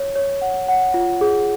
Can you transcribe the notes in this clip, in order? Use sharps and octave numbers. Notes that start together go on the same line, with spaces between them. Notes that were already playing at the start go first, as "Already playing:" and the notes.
Already playing: C#5
C#5
F#5
F#5
F4
G#4